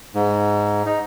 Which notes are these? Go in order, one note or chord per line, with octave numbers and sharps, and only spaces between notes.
G#2
D#4